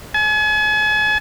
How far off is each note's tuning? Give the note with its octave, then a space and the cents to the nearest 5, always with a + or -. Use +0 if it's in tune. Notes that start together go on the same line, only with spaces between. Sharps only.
G#5 +40